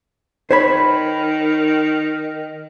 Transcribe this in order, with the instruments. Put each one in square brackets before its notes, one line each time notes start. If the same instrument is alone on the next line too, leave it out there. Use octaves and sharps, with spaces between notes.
[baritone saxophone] D#3 [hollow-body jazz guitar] C5 C#5 B5